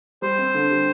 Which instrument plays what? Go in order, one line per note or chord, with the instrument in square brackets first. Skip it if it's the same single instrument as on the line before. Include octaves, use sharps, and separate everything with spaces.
[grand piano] G3 [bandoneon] C5
[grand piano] C4
D3
G3